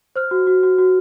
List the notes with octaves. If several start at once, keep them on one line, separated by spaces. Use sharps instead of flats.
C5 F6
F#4
F#4
F#4
F#4